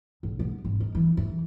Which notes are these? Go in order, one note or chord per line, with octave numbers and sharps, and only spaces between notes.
B1
B3
G#1
D#3
E3
E3